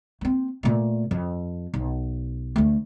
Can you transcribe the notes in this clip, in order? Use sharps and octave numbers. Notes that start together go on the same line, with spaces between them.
A#3 C4
A#2 A3
F2
B1
D2 A3